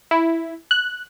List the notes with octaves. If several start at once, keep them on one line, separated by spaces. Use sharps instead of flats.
E4
F#6